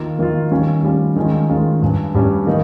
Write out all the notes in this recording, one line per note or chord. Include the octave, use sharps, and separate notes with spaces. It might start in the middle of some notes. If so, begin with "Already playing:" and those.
Already playing: D#3 A#3 F4
D#3 A#3 F4
D#3 G3 C#4 F4
D#3 G3 C#4 F4
D#3 G#3 C#4 F4
D#3 G#3 C#4 F4
G2 G3 C#4
G2 G3 C#4
D#3 A#3 D#4